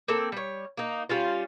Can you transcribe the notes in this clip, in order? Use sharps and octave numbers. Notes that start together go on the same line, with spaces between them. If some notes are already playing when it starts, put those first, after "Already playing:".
A#3 C4 A4
G3 C#5
A#3 D#4
G3 C#4 F4